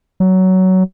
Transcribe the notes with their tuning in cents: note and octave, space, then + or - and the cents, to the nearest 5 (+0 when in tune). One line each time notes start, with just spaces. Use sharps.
F#3 +15